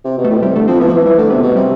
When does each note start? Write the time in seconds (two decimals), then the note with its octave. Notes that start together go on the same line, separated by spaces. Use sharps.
0.05 C3
0.18 B2
0.24 A3
0.30 A2
0.37 B2
0.42 C3 G3
0.56 D3 A3
0.68 F3 C4
0.80 E3 B3
0.87 F3
0.93 E3
1.05 E3 G3
1.18 D3 A3
1.30 C3 B3
1.43 B2
1.55 C3 G3